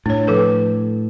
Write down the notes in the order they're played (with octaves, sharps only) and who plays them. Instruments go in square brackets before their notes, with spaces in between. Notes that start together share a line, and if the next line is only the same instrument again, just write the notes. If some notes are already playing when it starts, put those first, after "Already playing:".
[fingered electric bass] A2 [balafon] D4 C#5
[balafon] F3 A4 B4